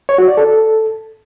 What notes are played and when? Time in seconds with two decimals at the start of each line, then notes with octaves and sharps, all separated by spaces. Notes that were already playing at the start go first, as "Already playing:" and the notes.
0.09 C#5
0.18 F#4
0.28 D5
0.37 A4